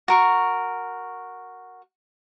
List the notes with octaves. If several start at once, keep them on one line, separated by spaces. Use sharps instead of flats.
F#4 A#4 C#6